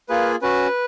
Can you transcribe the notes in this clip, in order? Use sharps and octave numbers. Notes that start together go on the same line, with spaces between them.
A#3 F4 G#4 B4
C#4 F#4 B4